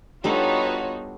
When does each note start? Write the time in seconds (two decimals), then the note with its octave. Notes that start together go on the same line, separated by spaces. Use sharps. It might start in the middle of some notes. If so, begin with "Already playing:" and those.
0.24 G3 B3 D4 D#4 F4 F#4 A4 C#5